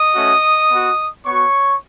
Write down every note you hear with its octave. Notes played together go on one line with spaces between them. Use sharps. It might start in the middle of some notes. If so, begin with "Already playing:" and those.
Already playing: D#5 D#6
A3 C#4 F#4
B3 F#4
B3 F#4 C#5 C#6